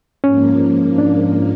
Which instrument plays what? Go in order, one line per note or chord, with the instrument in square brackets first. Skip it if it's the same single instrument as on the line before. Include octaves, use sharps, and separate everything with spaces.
[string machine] G#2 F3 A#3 [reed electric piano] C#4
[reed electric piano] D4